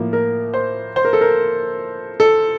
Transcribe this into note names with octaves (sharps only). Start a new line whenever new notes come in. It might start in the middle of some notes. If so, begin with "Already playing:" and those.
Already playing: A2 F3 A#3
A#4
C5
C5
A#4
A4
A#4
A4